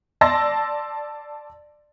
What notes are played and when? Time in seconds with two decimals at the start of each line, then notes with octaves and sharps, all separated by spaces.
0.21 D5 A5 C6 E6 A#6